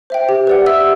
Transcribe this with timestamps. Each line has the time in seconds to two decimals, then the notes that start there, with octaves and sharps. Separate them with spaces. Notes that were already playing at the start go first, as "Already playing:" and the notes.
0.10 C5 E5 G5
0.29 G4
0.47 B4 D5 F#5
0.66 G4 E5 E6